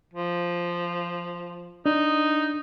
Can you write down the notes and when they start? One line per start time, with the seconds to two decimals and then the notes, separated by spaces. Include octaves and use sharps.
0.13 F3
1.86 D4 D#4